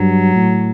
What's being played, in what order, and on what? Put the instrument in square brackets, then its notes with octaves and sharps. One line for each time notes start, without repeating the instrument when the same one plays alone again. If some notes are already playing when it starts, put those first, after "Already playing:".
Already playing: [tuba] G2 [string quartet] F#3
[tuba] A2